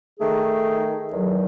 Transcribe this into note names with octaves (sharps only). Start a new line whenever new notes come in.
D#3 A3 D#4 G#4
E2 D#3 F#3